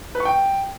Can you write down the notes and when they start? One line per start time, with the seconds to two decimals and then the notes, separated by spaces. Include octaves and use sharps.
0.15 B4
0.20 C#6
0.25 G5